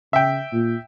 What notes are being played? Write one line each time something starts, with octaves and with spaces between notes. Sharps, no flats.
C#3 E5 G5
A#2